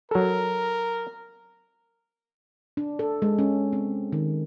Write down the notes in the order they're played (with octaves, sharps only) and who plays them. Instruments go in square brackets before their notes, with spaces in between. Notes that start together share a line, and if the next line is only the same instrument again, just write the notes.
[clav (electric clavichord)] F#3 A4 [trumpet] A#4
[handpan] D4
A4
G#3
C#4
C4
D#3